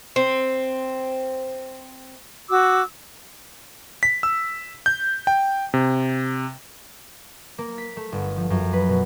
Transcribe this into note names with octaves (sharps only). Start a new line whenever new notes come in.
C4
F#4 D6 E6
B6
E6
G6
G5
C3
A#3
B6
A3
G1
F3
F#2
B4
B2